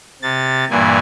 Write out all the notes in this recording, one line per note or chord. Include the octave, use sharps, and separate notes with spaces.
C3 A6
G2 A#2 E3 A#3 G#5